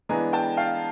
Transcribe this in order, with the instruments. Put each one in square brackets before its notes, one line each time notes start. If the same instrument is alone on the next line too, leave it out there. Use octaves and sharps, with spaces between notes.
[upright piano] E3 G#3 B3 D4 G#5 A#5
G5 A5
F5 G5